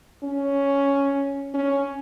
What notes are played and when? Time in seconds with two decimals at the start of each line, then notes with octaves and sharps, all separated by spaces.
0.24 C#4
1.54 C#4